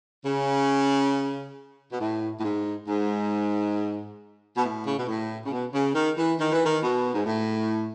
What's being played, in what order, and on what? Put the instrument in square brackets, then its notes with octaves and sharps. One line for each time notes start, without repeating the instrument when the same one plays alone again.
[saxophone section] C#3
B2
A2
A2
G#2
G#2
B2
A2
C#3
B2
A2
C#3
B2
C#3
D#3
E3
D#3
E3
D#3
B2
G#2
A2